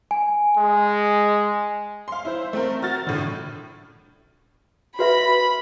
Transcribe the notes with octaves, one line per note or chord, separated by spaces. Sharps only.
G#5
G#3
F5 C6
E4 C5
A3 C4 A#4
F#4 F6 A6
A2 D3
F#4 B4 E5 B5